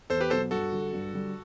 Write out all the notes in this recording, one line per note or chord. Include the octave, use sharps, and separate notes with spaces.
E2 A4 C5
G4 B4
B2 F#3 B3 F#4 A4 C5
G2 F#4 A4
D3 G3
G2
D3 G3